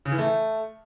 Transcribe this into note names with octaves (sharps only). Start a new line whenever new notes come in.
C#3
E3
A3